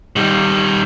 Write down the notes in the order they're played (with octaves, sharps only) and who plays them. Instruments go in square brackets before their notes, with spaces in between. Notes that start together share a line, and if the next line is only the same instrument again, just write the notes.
[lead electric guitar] D#3 G3